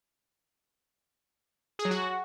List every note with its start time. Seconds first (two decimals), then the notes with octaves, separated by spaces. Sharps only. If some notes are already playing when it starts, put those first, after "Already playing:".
1.79 G#4
1.85 F#3
1.91 F#4